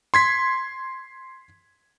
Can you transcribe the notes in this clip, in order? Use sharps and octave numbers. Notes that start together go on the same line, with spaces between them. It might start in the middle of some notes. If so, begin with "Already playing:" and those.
C6 G#6 B6